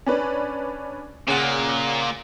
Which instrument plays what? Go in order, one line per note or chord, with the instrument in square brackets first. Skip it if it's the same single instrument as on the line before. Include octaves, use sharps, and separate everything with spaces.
[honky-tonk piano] C#4 D4 B4
[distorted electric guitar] A#2 [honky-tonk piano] C#3 F#5